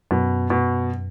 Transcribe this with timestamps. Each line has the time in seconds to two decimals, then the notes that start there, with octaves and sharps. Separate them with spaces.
0.11 F#2 B2
0.50 B2